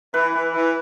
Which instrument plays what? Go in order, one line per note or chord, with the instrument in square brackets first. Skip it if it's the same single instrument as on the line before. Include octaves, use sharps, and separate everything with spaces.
[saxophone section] E3 [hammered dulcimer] B4
[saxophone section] E3
E3